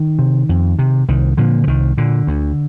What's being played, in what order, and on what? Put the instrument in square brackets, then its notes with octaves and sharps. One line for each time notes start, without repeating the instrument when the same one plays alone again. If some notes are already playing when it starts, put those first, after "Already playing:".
Already playing: [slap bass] D#3
C3
F2
C3
C2 D#3
A#2 D3 F3
F3
C2 D#3
A#2 D3
D2